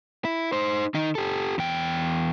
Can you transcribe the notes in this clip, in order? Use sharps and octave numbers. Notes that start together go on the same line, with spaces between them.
E4
D#4 C5
D#3 D#4
G4 A4
E2 G5